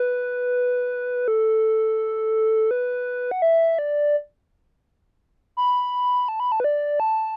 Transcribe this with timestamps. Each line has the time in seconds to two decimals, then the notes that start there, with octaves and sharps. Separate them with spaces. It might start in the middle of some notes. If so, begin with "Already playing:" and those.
Already playing: B4
1.28 A4
2.71 B4
3.31 F#5
3.42 E5
3.79 D5
5.57 B5
6.28 A5
6.40 B5
6.52 A5
6.60 B4
6.64 D5
7.00 A5